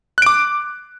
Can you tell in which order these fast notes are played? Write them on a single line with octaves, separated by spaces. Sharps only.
F#6 D7 D6